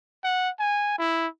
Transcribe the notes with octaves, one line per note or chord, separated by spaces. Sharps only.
F#5
G#5
E4